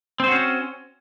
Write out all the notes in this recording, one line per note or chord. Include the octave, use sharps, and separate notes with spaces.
C4 C#4 F#4 C5